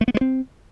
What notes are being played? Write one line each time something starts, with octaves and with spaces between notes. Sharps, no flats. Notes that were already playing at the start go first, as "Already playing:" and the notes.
A3
B3
G#3
C4